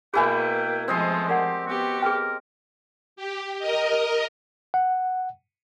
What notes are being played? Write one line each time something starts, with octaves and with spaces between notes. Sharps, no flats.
B2 A#3 E4 G#4 B4 G5 G#5
F3 G#3 A3 B3 C4 C5 D#5 C6
G4 A#4 D5 F#5
B3 F#4 G4
G#4 A#4 B4 G5
G4
A#4 D#5
F#5